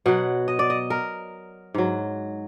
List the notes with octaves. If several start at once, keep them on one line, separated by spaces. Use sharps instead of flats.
B2 F#3 F#5
D#5
D5
D#5
A#4
G#2 F#3